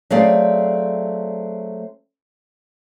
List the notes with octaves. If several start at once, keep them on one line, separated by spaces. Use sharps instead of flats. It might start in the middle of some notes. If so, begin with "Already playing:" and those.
F#3 A3 C4 G#4 D5 F5